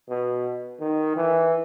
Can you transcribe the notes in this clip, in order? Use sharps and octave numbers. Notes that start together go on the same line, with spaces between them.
B2
D#3
E3